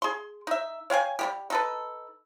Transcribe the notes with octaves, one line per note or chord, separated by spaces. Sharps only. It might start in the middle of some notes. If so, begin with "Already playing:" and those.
G#4 C6
D#4 E5
C#5 F5 G5 G#5
G3 A#3 G4
D#4 A4 B4